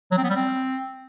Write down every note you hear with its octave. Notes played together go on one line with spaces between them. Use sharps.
F#3
C4
B3
G3
C4